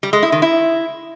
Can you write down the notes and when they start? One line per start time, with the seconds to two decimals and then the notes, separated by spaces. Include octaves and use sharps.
0.03 G3
0.13 G#3
0.23 E4
0.32 D#3
0.42 E4